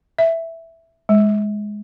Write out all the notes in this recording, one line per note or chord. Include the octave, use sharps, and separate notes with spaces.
E5
G#3